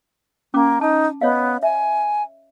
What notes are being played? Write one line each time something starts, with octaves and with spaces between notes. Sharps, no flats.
A#3 C#4 D6
D#4 A5
B3 C#5 D#5 F5
E5 G#5